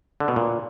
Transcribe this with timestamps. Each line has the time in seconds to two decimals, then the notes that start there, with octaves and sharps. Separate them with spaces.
0.20 D3
0.28 B2
0.36 A#2